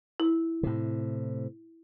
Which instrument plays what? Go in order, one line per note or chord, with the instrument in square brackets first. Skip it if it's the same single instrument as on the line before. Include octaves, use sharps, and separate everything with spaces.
[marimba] E4
[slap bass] A2 C3